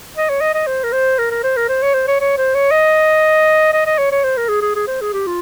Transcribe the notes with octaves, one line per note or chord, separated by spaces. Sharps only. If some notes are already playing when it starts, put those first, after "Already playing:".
D#5
C#5
D#5
D#5
C5
A#4
C5
A#4
A#4
C5
A#4
C5
C#5
C5
C#5
C#5
C5
C#5
D#5
D#5
D#5
C#5
C#5
C5
A#4
G#4
G#4
G#4
C5
G#4
G4
F4